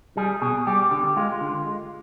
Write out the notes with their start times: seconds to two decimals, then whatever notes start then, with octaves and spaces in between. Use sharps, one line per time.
0.17 G3 G#4
0.42 B2 G#4
0.67 G3 G4
0.91 D3 G4
1.16 G#3 F4
1.41 D3
1.66 G#3